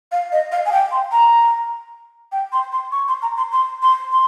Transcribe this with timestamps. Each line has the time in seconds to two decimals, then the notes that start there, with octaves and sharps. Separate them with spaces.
0.12 F5
0.32 D#5
0.52 F5
0.66 G#5
0.72 G5
0.91 C6
1.12 A#5
2.32 G5
2.52 C6
2.72 C6
2.92 C#6
3.08 C6
3.22 A#5
3.37 C6
3.52 C6
3.82 C6
4.12 C6